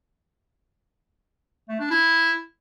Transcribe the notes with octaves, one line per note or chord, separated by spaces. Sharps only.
A3
D4
E4